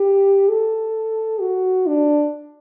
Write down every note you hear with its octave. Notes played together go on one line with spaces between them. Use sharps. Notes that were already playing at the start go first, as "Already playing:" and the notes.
Already playing: G4
A4
F#4
D4